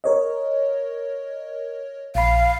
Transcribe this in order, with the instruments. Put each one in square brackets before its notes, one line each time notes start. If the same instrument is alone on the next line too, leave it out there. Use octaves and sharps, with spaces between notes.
[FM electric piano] A#4 C#5 D#5
[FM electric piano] A#1 B5 [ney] F5